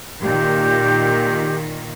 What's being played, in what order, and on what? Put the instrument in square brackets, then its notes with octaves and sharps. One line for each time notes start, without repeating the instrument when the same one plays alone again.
[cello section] A#2 D#3 [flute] G4